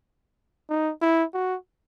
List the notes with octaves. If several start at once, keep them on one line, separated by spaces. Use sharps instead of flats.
D#4
E4
F#4